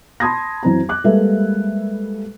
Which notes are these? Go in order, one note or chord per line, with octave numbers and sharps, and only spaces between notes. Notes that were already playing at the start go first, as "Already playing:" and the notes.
A5 B5 C6 D#6 G#6 A#6
F#2 E3 C4 A#5
D6 F#6
G3 G#3 A#3 A4 B4 E5